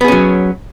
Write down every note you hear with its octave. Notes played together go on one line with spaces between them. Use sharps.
F#3 B3 C#4 G#4